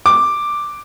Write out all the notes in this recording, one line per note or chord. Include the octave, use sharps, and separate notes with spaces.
D6